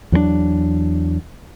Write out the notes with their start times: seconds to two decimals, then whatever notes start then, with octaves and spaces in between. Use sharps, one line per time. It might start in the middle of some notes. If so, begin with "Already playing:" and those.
0.12 E2 F#3 G#3 D4